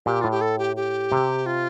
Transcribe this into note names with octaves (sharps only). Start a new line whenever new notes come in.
A#2 G4
A2 F4
G4
A4
G4
G4
C3
F4